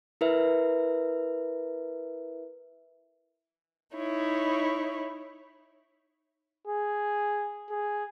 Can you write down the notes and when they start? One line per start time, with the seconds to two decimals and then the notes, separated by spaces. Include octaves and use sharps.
0.21 E4 A#4 B4 E5
3.96 D#4 E4 C#5
6.68 G#4
7.70 G#4